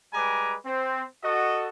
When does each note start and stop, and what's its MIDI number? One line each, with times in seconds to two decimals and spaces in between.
0.14 0.56 55
0.14 0.56 56
0.14 0.56 71
0.14 0.56 80
0.14 0.56 82
0.14 0.56 86
0.66 1.03 60
1.24 1.68 66
1.24 1.68 69
1.24 1.68 75